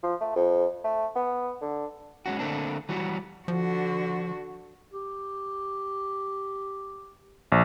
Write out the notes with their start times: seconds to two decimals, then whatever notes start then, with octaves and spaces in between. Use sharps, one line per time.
0.03 F3
0.20 A3
0.36 F2
0.84 A3
1.16 B3
1.62 D3
2.26 G#3 C#4 F#4
2.39 D3 A3 A#3 C4 D4
2.89 E3 F#3 G3 F#4
3.48 D3 F3 F#4
4.93 G4
7.52 A#1